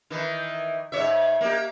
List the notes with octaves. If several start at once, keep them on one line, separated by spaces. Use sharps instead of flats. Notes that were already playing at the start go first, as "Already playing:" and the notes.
D#3 E3
G#2 C#5 E5
A#3 G4